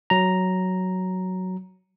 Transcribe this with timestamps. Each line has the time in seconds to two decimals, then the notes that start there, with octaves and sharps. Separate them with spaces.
0.10 F#3 A#5